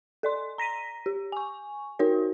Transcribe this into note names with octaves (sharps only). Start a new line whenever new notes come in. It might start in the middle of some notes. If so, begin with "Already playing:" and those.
A4 D5 C6
A#5 A#6 B6 D#7
G4
G#5 C#6
D#4 F#4 A#4 C#5